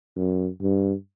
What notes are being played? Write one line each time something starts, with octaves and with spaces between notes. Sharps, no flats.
F#2
G2